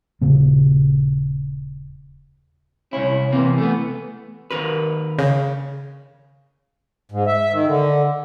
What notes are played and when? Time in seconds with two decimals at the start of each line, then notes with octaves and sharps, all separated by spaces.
0.21 D#1 C#3 A#3
2.93 C2 C#4 E4
3.32 C3 E3 A#3
3.58 A3 B3
4.51 D#2 A#4 B4
5.19 C#3
7.12 G#2
7.26 E5
7.52 D#3
7.68 D3